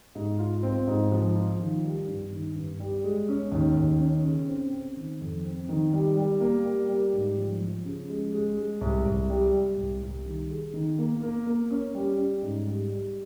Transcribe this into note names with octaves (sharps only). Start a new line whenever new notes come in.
G#2
F4
C4
G#2
F3
F4
D#3
G3
G2
D#3
G2
G3
G#3
C#4
D#2
D#2
C#4
C#3
C4
C4
D#3
F2
C4
D#3
G3
G3
A#3
G3
G3
G#2
F3
F3
C#3
G#3
G#3
G#3
C2
C2
G3
G3
C2
C2
D#3
G#4
D#3
A#3
A#3
A#3
C#4
G3
C#4
G#2
G3
G3